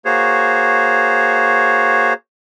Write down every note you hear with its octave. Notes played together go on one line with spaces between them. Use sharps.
A#3 F#4 G#4 C5 C#5